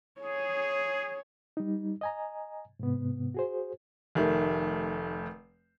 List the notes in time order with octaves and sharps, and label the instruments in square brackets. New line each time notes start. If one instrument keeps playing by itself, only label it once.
[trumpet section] G#4 [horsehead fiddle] C#5
[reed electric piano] G3 D#4
D#5 G#5 A#5
G#2 C3 B3
F#4 G#4 C5
[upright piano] F1 D#3 A3